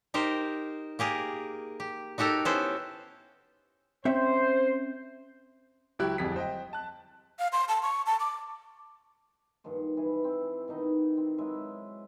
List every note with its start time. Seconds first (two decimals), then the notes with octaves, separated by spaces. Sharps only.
0.14 D#4 G4 A#4 C5
0.99 A#3 G4 G#4 A#4
1.80 G4
2.18 D#4 F#4 G4 A4 A#4
2.45 B3 C#4 E4 A4 C5
4.05 C4 C#4 C5 E5
5.99 C#2 F#3 E4 G4 F#6
6.18 D1 F2 G3 G#4 B6
6.36 C5 D#5 G5
6.73 A5 F#6
7.39 F5
7.53 C6
7.68 A5
7.83 C#6
8.06 A5
8.20 D6
9.64 G2 A#2 D#3 F3
9.97 E3 G#4
10.24 C4
10.68 B2 D#3 D#4 D#5
11.17 C4
11.38 F#3 G#3 B4 E5